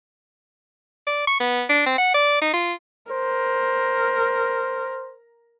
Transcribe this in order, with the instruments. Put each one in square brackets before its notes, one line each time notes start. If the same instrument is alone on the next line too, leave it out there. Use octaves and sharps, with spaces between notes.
[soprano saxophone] D5
C#6
B3
D4
C4
F#5
D5
D#4
F4
[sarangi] A#4 [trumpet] C5